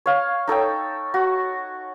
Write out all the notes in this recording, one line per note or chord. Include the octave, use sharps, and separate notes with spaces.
C#5 F5
D#4 A4 C#5 G5
F#4